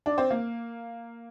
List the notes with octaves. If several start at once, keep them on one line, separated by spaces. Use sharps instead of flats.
D4
C4
A#3